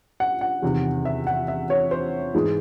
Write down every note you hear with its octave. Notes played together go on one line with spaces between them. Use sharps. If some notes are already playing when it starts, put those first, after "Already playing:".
F#5
F#5
E2 C3 D#3
E5
F#5
E5
C#5
C5
G#2 E3 G#3